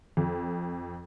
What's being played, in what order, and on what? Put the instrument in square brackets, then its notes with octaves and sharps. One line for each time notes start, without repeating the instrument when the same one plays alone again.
[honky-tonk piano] F2